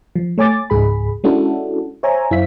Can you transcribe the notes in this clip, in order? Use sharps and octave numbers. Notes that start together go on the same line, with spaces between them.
F3
A3 C#5 G#5 D6 A6
C#2 G#2 G#4 B5
G#3 C#4 D4 E4 F#4 A4
C5 C#5 E5 G#5 A#5
F#2 E4 C5 E5 F5 B6